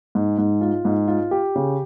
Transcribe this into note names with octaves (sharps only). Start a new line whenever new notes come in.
G#2
G#2
F4
G#2
F4
G4
C#3